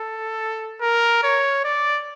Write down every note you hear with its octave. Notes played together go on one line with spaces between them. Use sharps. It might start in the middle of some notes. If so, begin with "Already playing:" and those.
Already playing: A4
A#4
C#5
D5